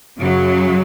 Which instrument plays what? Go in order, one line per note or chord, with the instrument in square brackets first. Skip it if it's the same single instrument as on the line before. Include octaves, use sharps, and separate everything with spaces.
[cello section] F#2 C#3 F#3